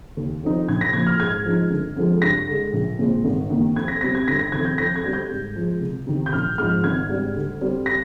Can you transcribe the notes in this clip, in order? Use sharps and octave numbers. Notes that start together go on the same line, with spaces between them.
D#2
D3 F3 C4 D#4
A#1 G#6
A#6
A#2 F3 G#6
F6
G#2 G#6
F3 G#3 D#4
G1
F2 D3 F3 G#3
G2 A#6
D3 G#3
A#1
A#2 G#3 C4
G#1
G2 D#3 A#3
F2 G#6
A#6
C3 G3 C4 A#6
G#6
G1 A#6
A#6
F2 C3 D#3 G#6
G6
F2 A#6
G#6
D3 G3 C4
G6
G#2
F3 G#3
C2
C3 D#3
G6
A#1 F6
G#2 F3 F6
G#1 G#6
G#2 G3 D4
D2
D3 G3 C4
A#6